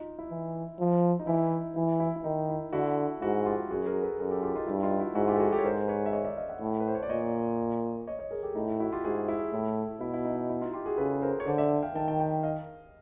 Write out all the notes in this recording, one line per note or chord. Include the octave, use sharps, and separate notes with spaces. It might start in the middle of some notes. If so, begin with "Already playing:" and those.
Already playing: D#4 F4
E4
E3
F3
D#4
E3 E4
E3 E4
E4
E4
D#3 D#4
E4
D3 E4 F#4
G#2 E4 F#4
F4 G4
F#2 F#4 G#4
G#4 A#4
A4 B4
F#2 G#4 A#4
G4 A4
F4 G4
D#4 F4
G2 E4
D#4 F4
E4 F#4
G#2 E4 F#4
F4 G4
A4
F#4 G#4
G4 A4
C#5
G#2 A#4 C5
B4 C#5
E5
C#5 D#5
D5 E5
D#5 F5
E5 F#5
A2
B4
C5
C#5
D5
A#2 C#5 D#5
C#5 D#5
C#5 D#5
G#4 A#4
G4 A4
A2 D#4
E4
E4 F#4
F4 G4
G#2 F#4 G#4
E4
A2
B2 E4
E4
D#4
E4
D#4 F4
F4 G4
F#4 G#4
C#3 A4 B4
A#4 C5
C#5
D3 C5 D5
D5 E5
F5 G5
D#3 G5 A5
G5 A5
G5 A5
D#5 F5